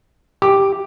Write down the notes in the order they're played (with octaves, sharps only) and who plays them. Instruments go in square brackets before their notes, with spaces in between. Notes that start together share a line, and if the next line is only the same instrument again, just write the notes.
[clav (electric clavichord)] G4 [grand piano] D6